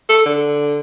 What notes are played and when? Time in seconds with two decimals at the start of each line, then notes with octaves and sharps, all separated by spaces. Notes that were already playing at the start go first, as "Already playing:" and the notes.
0.09 A4
0.25 D3